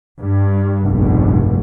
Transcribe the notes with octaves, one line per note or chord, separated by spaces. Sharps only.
G2
F1 A#1 G2 B2